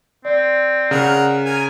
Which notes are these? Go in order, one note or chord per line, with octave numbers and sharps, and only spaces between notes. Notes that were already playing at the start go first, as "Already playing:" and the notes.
C4 D5
C#3 A#4 F#5
A#4 G#5